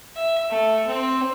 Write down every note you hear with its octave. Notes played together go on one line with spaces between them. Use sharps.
E5
A3
C4